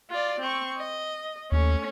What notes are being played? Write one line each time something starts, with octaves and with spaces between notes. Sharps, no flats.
F4 D5
C4 C#6
D#5
D#2 A3 C#4